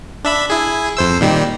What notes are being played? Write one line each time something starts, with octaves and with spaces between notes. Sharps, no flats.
D4 E5 B5
E4 G#4
F2 C5 E6
A#2 D#3 G3